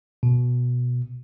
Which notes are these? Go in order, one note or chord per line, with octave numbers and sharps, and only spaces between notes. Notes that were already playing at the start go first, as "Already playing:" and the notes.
B2